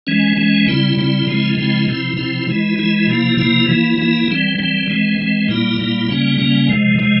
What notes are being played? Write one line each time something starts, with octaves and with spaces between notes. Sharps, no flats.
E3 G#3 C#4
E3 G#3 C#4
C#3 G3 C4 E4
C#3 G3 C4 E4
C#3 F3 G#3 C4 E4
C#3 F3 G#3 C4 E4
C3 F3 C4 E4
C3 F3 C4 E4
E3 G#3 E4
E3 G#3 E4
C3 F3 A#3 E4
C3 F3 A#3 E4
E3 A#3 E4
E3 A#3 E4
E3 G3 C4
E3 G3 C4
E3 G#3 C4
E3 G#3 C4
A#2 G3 A#3 E4
A#2 G3 A#3 E4
C#3 G3 A#3 C#4
C#3 G3 A#3 C#4
C3 F3 G#3
C3 F3 G#3